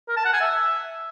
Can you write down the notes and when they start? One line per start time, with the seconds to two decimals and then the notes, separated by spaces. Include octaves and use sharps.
0.09 A#4
0.17 A5
0.25 F#5
0.33 G#5
0.41 E5